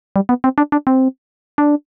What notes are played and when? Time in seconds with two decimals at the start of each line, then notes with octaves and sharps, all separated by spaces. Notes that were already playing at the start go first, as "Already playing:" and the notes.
0.16 G3
0.29 B3
0.44 C4
0.58 D4
0.72 D4
0.87 C4
1.58 D4